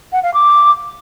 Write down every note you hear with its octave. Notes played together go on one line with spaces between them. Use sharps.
F#5
F5
D6